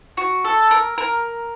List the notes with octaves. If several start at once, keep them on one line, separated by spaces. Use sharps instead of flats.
F#4
A4
A#4
A#4